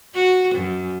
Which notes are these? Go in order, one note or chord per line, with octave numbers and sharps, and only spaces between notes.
F#4
F#2